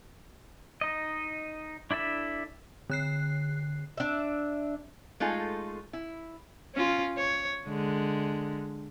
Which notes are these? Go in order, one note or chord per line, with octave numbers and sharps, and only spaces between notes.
D#4 D#5
D4 E4 A4 E5
D3 F#6 C7
D4 E5
G#3 A3 D#4 F4 A4
E4
C#4 F4
C#5
D3 G#3